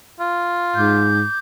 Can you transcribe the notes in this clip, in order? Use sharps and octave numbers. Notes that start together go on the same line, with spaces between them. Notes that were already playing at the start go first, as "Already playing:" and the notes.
F4
G#2 D6 G6